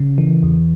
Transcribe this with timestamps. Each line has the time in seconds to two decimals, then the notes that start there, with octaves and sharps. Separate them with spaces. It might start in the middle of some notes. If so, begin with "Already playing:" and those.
Already playing: C#3
0.18 E3
0.43 E2